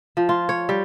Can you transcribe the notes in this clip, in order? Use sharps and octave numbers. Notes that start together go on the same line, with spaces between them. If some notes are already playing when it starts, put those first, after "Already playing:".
F3
F4
C#5
G3